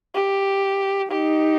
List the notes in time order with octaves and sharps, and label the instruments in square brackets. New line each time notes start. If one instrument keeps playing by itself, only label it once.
[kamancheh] G4
[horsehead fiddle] D#4 [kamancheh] G4